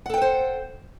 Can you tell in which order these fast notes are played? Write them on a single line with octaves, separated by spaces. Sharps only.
F#5 A4 G5 B4 C5